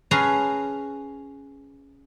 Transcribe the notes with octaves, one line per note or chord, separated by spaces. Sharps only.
C#4 G#4 B4 F5 A5 A#5